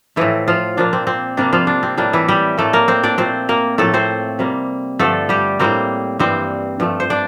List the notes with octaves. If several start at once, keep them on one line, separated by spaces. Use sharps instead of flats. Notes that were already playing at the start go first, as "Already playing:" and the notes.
A2 E3 F3 A3 E4
F3 F4
A#2 F3 A#3 D4
C4
C4
C3 G3 A#3 D4
F3 F4
D4
C4
A2 G3 A#3 D4
E3 E4
G3 G4
A2 G3 A3 A#3 A4
A#3 A#4
C4 C5
D4 D5
A#2 A3 C4 C5
A#3 A#4
A2 F3 A3 A#3 A4
C4 C5
C3 G3 A#3
G2 D3 F3 A3 A4
G3 G4
A2 G3 A#3 C4 C5
G2 E3 G3 C4 C5
G2 F3 A3
C5
D4 D5